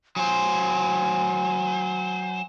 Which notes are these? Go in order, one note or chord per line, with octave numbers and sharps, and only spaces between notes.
F#3 C5 G#5